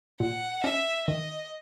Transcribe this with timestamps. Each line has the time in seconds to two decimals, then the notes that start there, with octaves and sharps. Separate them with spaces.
0.20 A#2 F#5
0.64 C#4 E5
1.08 D#3 D#5